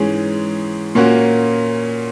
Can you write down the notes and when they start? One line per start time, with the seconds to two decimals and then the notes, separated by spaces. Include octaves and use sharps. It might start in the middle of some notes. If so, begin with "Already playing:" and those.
Already playing: G#2 E3 G#3 C#4 G#4
0.95 A#2 A#3 C#4 F#4